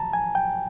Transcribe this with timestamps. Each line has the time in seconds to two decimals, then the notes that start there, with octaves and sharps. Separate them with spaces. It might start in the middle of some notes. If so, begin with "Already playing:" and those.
Already playing: A5 A#5
0.13 G#5
0.35 G5